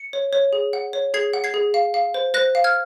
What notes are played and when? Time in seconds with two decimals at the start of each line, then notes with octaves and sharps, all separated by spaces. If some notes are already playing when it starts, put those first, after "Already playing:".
Already playing: C#7
0.13 C#5
0.33 C#5
0.53 G#4
0.73 F#5
0.93 C#5
1.14 G#4 G#6 C7
1.33 F#5
1.44 G#6 C7
1.54 G#4
1.74 F5
1.94 F5
2.14 C5
2.34 C5 F#6 A#6
2.55 F5
2.64 F6 G#6